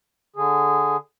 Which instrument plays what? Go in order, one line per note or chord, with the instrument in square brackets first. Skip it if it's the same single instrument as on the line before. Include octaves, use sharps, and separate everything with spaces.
[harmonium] D3 G#4